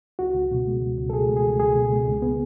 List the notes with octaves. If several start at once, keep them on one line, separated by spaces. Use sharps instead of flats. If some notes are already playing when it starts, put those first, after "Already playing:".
C#2 F#4
C#2
B2
G#3
C#2
C#2
A4
B2 G#4
G#3
G#4
C#2
C#2 G#4
B2
G#3
C#2
B3